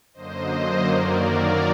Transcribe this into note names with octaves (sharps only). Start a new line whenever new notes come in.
F#2 D3 F#3 A#3 C5 D#5
F#2 D#3 F#3 A#3 A#4 D5